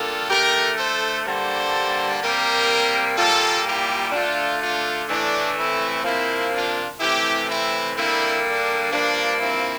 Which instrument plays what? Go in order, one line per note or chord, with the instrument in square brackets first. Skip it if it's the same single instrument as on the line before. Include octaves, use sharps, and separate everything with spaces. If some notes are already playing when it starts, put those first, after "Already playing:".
Already playing: [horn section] D3 G3 A#3 F4 A4
D3 A3 G4 A#4
A4 C5
G2 D3 G3 A#3 A4 C5
C3 G3 A#3 G4 A#4
A#2 G3 A#3 F4 A4
E4 G4
D3 A3 D4 F4
D4 F4
A2 E3 A3 D4
C4 E4
C3 F3 A#3 C4 E4
D4 F4
C3 E3 A3 E4 G4
C4 E4
D3 G3 A#3 C4 E4
D4
G2 F3 A#3 D4
C4 E4